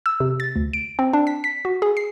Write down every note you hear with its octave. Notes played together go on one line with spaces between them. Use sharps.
E6
C3
A6
D2
D7
C4
D4
B6
B6
F#4
G#4
C7